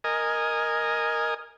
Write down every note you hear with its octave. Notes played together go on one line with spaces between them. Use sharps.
A#4 D#5 G#5